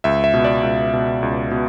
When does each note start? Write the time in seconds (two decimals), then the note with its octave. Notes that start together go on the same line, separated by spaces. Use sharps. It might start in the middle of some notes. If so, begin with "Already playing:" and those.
0.04 C#2 E5
0.24 E5
0.34 B2
0.44 D5
0.63 C#2
0.93 B2
1.23 C#2
1.51 B2